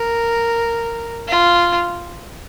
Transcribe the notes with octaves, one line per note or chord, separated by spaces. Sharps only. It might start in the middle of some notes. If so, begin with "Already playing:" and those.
Already playing: A#4
F4